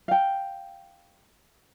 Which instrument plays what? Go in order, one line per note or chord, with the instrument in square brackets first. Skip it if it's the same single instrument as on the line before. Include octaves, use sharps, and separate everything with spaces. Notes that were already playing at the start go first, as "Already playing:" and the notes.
[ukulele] F5 G5